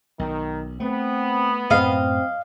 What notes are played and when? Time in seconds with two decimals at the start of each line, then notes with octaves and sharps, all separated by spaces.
0.19 B1 D#3
0.80 A3 B3 C4
1.70 F#2 A2 C4 D#5 F5